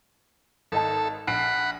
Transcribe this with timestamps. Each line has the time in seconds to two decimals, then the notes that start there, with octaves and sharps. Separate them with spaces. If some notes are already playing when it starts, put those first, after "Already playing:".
0.72 G#1 D#4 A4 A5
1.27 A#1 F#5 B5 C7 D7